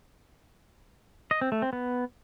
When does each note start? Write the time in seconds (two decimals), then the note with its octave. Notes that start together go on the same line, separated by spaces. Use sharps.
1.31 D#5
1.41 C4
1.52 A3
1.62 C4
1.73 B3